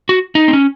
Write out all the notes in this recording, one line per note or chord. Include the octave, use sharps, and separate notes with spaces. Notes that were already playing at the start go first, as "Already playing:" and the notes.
F#4
D#4
C4
C#4